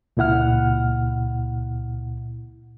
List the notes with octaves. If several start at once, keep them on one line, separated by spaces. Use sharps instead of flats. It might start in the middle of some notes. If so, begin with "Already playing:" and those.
C#2 A#2 E4 F#5 F6